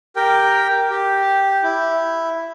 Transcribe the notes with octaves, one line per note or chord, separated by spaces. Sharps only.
G4 A#4 G5
G4
E4